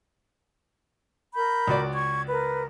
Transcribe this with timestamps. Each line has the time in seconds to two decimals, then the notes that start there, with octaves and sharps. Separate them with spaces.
1.35 A#4 B5 G6
1.67 C#2 F#4 D5
1.94 C#6 G#6
2.28 A#4 B4